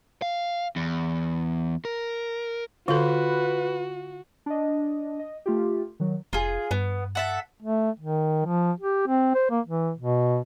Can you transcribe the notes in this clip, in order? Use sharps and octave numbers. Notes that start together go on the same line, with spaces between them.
F5
E2
A#4
D3 F4 F#4 A4 B4
D4 D#5
D#5
A3 F4 G4
D#3 F#3
F1 F4 G#4
G2 B3
A4 E5 F#5
A3
D#3
F3
G4
C4
C5
A#3
E3
B2